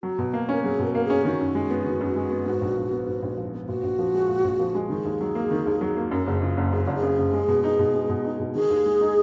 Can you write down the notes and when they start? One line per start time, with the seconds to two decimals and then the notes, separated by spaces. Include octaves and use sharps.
0.03 F#3 F#4
0.19 B2
0.33 A#3
0.49 C#4 A#4
0.63 F#3 G#4
0.79 B2 A#4
0.94 A#3 A#4
1.05 G#4
1.10 C#4
1.25 D#3 F#4
1.40 F#2
1.55 G#3
1.70 B3
1.86 D#3
2.01 F#2
2.16 G#3
2.31 B3
2.46 G#2
2.61 A#1
2.77 F3
2.92 B3
3.07 G#2
3.23 A#1
3.37 F3
3.53 B3
3.68 A#2 F#4
3.83 A#1
3.99 F3
4.14 G#3
4.29 A#2
4.44 A#1
4.59 F3
4.75 G#3
4.90 D#3 G#4
5.05 D#2
5.21 F#3
5.35 A#3
5.51 D#3
5.66 D#2
5.81 F#3
5.96 A#3
6.11 F#2 A#4
6.27 F#1 G#4
6.42 C#3 F4
6.57 F#1
6.72 F#2 G#4
6.84 F#1 F#4
6.95 G#4
7.03 C#3
7.18 F#1
7.33 G#3
7.48 B2
7.64 D#4
7.79 B2
7.94 G#3
8.10 B2
8.25 D#4
8.40 B2
8.55 D#3 G#4
8.70 D#2
8.86 G#3
9.01 D#4